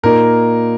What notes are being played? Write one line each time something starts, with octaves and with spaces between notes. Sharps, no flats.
A#2 A#3 D#4 A#4